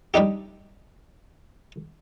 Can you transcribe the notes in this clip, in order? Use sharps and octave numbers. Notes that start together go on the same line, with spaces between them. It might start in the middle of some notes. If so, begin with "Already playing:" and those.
G3 D4 D#4 G4